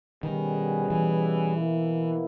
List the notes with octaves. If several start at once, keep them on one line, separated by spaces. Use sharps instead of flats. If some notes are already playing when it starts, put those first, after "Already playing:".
B2 D#3 G3 C#4 G#4 B4
E3
B2 A#3 E4